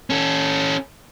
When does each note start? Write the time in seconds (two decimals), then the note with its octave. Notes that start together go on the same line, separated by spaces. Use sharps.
0.10 C#4 A4